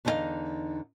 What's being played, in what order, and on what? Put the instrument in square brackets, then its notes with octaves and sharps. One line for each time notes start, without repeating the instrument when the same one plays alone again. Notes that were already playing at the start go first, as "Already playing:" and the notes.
[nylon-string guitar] E2 D3 D#4 E4 D#5 F5